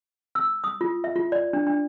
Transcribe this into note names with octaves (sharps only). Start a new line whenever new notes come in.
E6
D#6
F4
E5
F4
D5
D4
D4